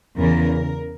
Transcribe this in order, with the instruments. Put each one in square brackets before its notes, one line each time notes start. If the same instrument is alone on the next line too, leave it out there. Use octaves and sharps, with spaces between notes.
[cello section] E2 C#3 E3 A#4